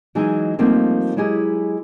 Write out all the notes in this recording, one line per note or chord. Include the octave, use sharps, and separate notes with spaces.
E3 F#3 G#3 D#4 G#4
F3 G3 A3 A#3 C4 D#4
F#3 G#3 E4 G4 G#4